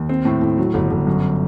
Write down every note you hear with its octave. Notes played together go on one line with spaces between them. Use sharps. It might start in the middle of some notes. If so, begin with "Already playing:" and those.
Already playing: D#2
C4
A2
A2
F#3
G1
G1
F#2